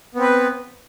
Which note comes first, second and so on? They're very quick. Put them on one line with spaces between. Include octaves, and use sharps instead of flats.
B3 C4 B4